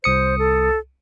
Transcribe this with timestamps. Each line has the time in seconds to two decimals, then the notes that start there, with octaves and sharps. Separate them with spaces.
0.04 C2 C5 D#6 C#7
0.38 A4